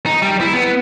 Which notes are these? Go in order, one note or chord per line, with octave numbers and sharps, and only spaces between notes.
D#4
G3
E4
B3